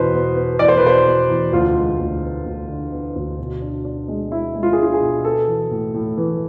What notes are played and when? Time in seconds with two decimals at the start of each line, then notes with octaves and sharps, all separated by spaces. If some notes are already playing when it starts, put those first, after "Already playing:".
Already playing: E2 B2 B4 C5
0.14 B3
0.36 B3
0.59 E2 D5
0.68 C5
0.77 B4
0.83 B2 C5
1.06 B3
1.30 E2
1.53 D2 F4
1.76 G#3
1.99 D2
2.22 B3
2.46 D2
2.69 D3
2.92 B3
3.16 D2
3.38 B2
3.62 D4
3.85 D4
4.08 G#3
4.31 G#3 E4
4.55 G#3
4.63 F4
4.73 G#4
4.78 D4 F4
4.94 G#4
5.01 B2
5.25 B3 A4
5.48 E3
5.71 A2
5.94 A2
6.17 E3